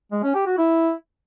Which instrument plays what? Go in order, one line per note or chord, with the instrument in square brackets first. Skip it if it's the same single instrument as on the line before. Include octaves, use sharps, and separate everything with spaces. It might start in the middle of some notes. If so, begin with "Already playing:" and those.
[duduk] G#3
C#4
G4
F#4
E4